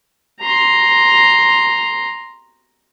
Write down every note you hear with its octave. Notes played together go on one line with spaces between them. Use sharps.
A#5 C6